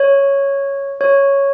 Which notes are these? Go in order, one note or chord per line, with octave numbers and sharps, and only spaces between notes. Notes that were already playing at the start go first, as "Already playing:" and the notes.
Already playing: C#5
C#5